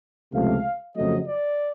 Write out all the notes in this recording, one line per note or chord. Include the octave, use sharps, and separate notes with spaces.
C#2 C3 F3 A3 F5
F2 C#3 F#3 A3 C4 D#5
D5